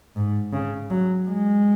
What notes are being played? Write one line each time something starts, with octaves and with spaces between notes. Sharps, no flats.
G#2
C#3
F#3
G#3